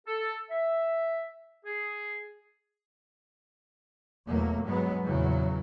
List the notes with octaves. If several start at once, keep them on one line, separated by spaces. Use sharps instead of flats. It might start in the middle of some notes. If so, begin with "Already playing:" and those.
A4
E5
G#4
E2 B2 F#3 A3 A#3
G2 F#3 G#3 B3
A#1 E2 C#3 F#3